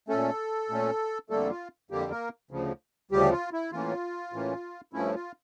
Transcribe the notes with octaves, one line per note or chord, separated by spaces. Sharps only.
A#2 A3 C#4 A4
A#2 A3 C#4
F2 D3 G3 A3 A#3 A4
F4
F2 D3 G3 A#3 G4
A#3 A#4
D2 C#3 F3
D2 C#3 F3 G3 G4
F4
E4
A2 E3 A#3 C#4 F4
A2 E3 A#3 C#4
G2 F3 A3 C#4 E4
F4